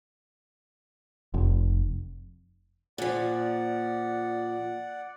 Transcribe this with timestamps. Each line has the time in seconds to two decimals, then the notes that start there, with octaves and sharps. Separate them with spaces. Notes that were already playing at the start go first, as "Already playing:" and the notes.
1.34 F1
2.98 A#2 F3 D5 F#5